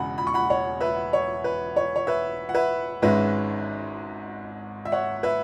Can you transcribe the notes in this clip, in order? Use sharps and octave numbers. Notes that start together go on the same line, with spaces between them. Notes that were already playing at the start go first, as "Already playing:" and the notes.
Already playing: E1 E2 C#3 F#5 B5
B5
C#6
F#5 B5
C#5 F#5
B4 E5
C#5
B4
C#5
C#5
B4 E5
F#5
B4 E5
G#1 G#2 G#3 C#4 B4 E5
E5
C#5 F#5
B4 E5